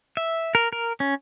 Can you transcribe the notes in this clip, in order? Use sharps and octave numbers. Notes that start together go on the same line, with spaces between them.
E5
A#4
A#4
C#4